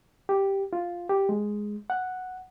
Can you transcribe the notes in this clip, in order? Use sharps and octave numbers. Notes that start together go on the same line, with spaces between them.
G4
F4
G4
G#3
F#5